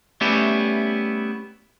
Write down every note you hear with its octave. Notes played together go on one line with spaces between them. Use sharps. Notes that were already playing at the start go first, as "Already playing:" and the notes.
G3 A3 B3 C#4 E4 G4